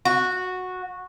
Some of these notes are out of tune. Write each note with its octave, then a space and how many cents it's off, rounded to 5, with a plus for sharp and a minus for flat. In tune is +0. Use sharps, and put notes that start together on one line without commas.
F#4 -10